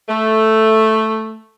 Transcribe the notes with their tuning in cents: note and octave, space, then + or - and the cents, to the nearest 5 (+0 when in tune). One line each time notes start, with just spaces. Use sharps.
A3 +0